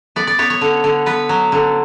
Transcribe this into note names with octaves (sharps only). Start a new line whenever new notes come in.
B3 D5
D5
B3 C#5
C#5
D3
D3
B3 B4
F#3
D3